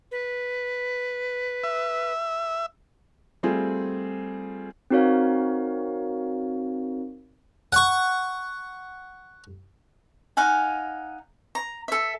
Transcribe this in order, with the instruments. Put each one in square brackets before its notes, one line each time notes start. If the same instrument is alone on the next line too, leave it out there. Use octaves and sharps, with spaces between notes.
[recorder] B4
[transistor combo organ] E5
[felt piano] G3 A3 C4 F4 G#4
[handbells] C4 D#4 F#4 A#4 C#5 F5
[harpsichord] F#5 C#6
[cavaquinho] D#4 F5 F#5 G#5
A#5
A4 E5